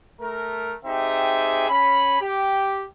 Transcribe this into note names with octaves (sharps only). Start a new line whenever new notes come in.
A3 A#4
C4 D#4 G4 G#4 E5
C#4 B5
G4